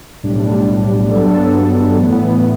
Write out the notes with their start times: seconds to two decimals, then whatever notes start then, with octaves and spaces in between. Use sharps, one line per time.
0.23 B1 A2 G3 D4
1.10 G2 F#3 B3 D4 A4
1.97 A2 E3 B3